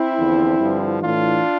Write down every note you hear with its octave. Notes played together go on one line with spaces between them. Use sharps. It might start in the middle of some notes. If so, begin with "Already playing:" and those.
Already playing: C4 E4
E2 D3 F3
G2 D3 F3
A2 E3 D4 F4